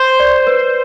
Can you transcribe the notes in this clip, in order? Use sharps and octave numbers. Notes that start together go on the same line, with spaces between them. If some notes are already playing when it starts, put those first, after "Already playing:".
Already playing: C5
D5
B4